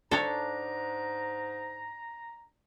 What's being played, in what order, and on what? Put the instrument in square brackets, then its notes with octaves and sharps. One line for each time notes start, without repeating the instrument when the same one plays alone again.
[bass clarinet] G#2 [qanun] D4 [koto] A4 C#5 [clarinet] A#5